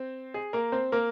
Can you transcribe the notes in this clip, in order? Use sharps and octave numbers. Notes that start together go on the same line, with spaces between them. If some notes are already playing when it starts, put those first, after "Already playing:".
Already playing: C4 C5
G#4
A#3 A#4
C4 C5
A#3 A#4